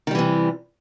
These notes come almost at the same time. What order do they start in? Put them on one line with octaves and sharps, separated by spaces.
D#3 G3 E3 C3